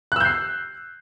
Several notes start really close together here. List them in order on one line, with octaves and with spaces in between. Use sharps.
F#6 E6 G6 C7